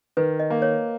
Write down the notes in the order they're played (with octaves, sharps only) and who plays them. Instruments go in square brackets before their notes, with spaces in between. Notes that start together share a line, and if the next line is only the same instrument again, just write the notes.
[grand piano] D#3 [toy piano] B4
[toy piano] D#5
[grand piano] A#3
[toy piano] C#5